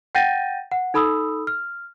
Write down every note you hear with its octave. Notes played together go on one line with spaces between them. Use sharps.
F#5 G5 G6 A6 A#6 D#7
F#5
D#4 A4 B5 D#6 E6
F6